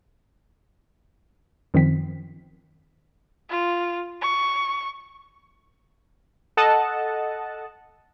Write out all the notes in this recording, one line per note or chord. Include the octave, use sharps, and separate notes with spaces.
F#2 D#3 F3 C4 B6
F4
C#6
A4 D#5 F#5 A5